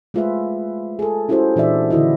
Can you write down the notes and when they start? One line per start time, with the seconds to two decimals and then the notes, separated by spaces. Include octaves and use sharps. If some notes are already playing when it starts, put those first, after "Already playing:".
0.14 G#3 A3 F4 G#4 B4 E5
0.99 G#4 A4
1.29 C#4 E4 F#4 G4 A4 C5
1.56 A#2 E3 D4 D5 E5
1.90 D3 D#3 E4 F#4 D#5